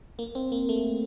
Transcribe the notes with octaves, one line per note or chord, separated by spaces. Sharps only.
A#3
C4
A#3
A3